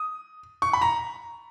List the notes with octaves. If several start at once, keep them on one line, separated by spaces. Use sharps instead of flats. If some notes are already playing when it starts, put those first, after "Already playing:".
Already playing: D#6
C#6
B5
A#5